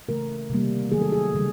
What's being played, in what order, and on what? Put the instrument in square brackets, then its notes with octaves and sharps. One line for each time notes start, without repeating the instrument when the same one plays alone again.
[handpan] C#3 E3 A3 A#4
C3 D#3 G3 A#3
D#3 F#3 A3 G#4
A4
G#4
C#3 E3 G3